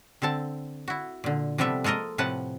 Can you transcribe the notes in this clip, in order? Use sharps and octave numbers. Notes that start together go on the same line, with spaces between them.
D3 C4 A4 A5
E4 F#4
A#2 D3
C3 F3 G3 B3 A4 E5
G#3 A#3 A4 A#4 D#5
A2 C3 F3 B4 F#5 A5